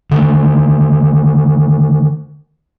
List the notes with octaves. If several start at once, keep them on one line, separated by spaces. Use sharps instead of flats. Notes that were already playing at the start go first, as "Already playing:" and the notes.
D3 D#3 G#3 A3